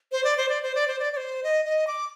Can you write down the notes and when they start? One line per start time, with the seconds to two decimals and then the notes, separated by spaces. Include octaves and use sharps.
0.12 C5
0.24 D5
0.37 C5
0.49 D5
0.63 C5
0.75 D5
0.88 C5
0.99 D5
1.12 D5
1.17 C5
1.44 D#5
1.65 D#5
1.87 D6